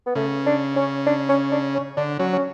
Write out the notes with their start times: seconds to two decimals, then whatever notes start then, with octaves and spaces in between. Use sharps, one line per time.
0.06 B3
0.15 C#3 A3
0.46 D4
0.76 C#4
1.06 D4
1.29 C#4
1.51 D4
1.74 C#4
1.96 D3 D4
2.19 F#3 C#4
2.33 C#4